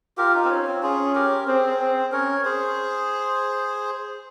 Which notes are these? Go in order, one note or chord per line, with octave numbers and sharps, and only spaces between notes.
F4 G4 A#4
D#4
C4
C#4
C4
C#4 F4 G#4
G4 A#4
C4 G#4 C5
C4
C#4 A#4 C#5
G#4 C5